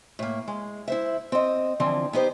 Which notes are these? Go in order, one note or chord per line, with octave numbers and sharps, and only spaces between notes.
A2 A#3
G#3
E4 C5 E5
C4 D#5
D3 E3 F3 C4
B3 D#4 G4 C5